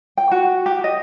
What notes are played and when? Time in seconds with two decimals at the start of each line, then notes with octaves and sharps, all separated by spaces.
0.17 G5
0.32 F#4
0.66 G4
0.84 D#5